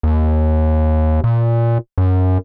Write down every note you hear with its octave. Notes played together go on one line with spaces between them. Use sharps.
D#2
A#2
F#2